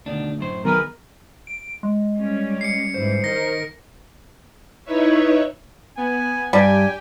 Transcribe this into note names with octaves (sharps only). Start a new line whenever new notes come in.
D2 B2 D#3 D4
F#2 A2 C5
B1 D#3 G#4 A#4 B4
D7
G#3
G3 C#4
C7 C#7
G#2 E3 G3 C5
D#3 D#4 A#4 A#6
D#4 E4 B4 C#5 E5
B3 G#5
G2 G3 G4 G5 G#5